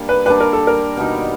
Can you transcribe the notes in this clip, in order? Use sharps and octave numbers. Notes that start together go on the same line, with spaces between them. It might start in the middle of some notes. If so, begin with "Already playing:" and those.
Already playing: G3 A#3 D4
B4
G3 A#3 D4 B4
A#4
A4
A#4
B2 G3 A#3 D#4